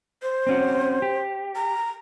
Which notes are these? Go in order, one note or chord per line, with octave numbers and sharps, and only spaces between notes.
C5
C4 C#4 F#4
G4
A#5